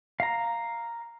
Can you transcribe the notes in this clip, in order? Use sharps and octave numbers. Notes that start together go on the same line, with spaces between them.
F5 A#5